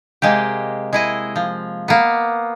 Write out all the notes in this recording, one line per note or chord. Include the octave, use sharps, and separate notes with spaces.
C3 G#3 A#3 G4
G#3 E4 D#5
F3
A#3 B3